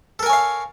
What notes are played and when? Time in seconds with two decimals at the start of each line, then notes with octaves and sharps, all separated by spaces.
0.19 A4
0.23 A#4
0.26 G#5
0.30 C#5
0.33 F5